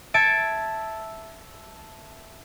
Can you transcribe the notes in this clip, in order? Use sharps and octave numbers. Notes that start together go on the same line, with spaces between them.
E5 A5 G#6 A6 C#7 D7